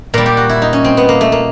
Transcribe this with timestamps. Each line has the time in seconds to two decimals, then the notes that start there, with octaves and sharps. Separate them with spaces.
0.14 A#2 G3 A#4
0.26 G4
0.37 F#4
0.49 E4
0.62 D#4
0.73 C#4
0.84 C4
0.97 B3
1.09 A#3
1.21 A3
1.32 A#3